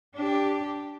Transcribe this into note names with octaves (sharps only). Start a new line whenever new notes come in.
D4 G4